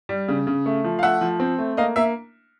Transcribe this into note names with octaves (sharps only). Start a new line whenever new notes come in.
G3
C#3
C#3
A3
F3
F5
A3 E5 F#5
F3
C4
A3
A#3 D#5 F5
A#3 E5